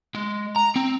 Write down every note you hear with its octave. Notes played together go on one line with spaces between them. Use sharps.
G#3
A#5
C4